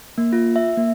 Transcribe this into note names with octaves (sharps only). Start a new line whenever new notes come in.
A#3
F4
E5
A#3